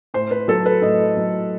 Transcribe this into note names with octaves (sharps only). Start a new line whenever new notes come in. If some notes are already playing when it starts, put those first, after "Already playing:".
A2 C5
B4
F#3 A4
B4
A2 D#5
F#3